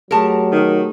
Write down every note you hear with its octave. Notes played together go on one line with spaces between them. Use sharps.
F#3 A3 G4 G#4 A#4 A5
D#3